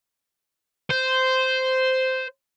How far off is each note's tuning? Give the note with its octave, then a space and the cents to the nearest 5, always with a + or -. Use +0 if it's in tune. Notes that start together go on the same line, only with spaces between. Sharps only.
C5 -10